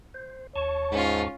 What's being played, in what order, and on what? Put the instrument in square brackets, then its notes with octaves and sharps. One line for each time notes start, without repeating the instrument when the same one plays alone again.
[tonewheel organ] C5
[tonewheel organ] D#2 A5 C#6 [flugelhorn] C#5
[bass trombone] G#2 [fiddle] C#4 F4